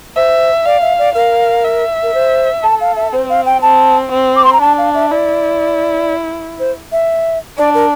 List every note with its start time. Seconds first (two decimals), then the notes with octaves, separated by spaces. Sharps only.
0.16 C5 E5
0.66 D5 F5
0.82 E5
0.98 D5
1.15 A#4 F5
1.64 E5
2.03 A#4
2.14 C5
2.63 A4 A5
2.80 F5
2.96 E5
3.13 C4 C5
3.29 F5
3.46 G5
3.62 C4 A5
4.11 C4
4.36 D6
4.44 C6
4.53 A#5
4.61 D4 A5
4.78 F5
4.95 E5
5.11 E4 D5
6.59 C5
6.92 E5
7.58 D4 D5
7.74 A#4